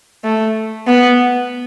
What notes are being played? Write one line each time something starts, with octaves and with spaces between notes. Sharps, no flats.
A3
B3